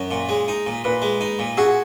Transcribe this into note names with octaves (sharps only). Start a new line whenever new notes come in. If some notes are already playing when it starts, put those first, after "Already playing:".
Already playing: F#2
A#2
G#3
D#4
A#2
A#2 B4
G#3
D#4
A#2
F#4 G#4